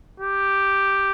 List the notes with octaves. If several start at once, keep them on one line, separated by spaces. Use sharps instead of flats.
G4